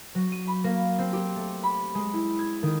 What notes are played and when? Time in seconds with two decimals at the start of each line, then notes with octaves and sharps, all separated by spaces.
0.15 F#3
0.32 D#7
0.47 B5
0.64 A#3
0.99 C4
1.13 G4
1.36 A3
1.63 B5
1.95 G#3
2.13 E4
2.39 G#6
2.63 D#3